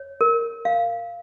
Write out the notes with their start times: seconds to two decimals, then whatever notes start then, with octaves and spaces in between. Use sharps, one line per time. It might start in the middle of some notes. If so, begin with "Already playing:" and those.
Already playing: C#5
0.21 A#4
0.65 F5